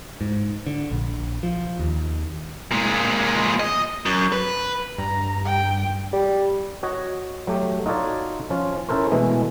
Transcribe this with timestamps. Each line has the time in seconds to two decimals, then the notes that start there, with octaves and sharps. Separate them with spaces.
0.21 G#2
0.66 D3
0.91 A#1
1.43 F3
1.79 D#2
2.72 A#2 G#3
3.60 D#5
4.06 F#2
4.32 B4
4.98 G2 A#5
5.45 G5
6.13 G3
6.83 F#4 C#5 D#5
7.47 F#3 A3 G4
7.86 D#4 F4 F#4 A4 C#5 D5
8.50 F3 C#4 F4
8.89 C#4 E4 A4 A#4 C5
9.11 B2 E3 G#3 A3 B3